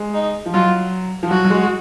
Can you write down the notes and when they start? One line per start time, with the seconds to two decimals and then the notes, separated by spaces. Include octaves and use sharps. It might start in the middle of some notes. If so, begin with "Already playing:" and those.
Already playing: G#3
0.14 D#4
0.46 F3
0.54 F#3 F4
1.23 F3
1.30 F#3 F#4
1.44 F#3
1.50 G#3